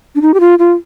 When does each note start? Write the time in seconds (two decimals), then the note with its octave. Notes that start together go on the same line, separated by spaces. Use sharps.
0.15 D4
0.22 D#4
0.34 G4
0.40 F4
0.59 F4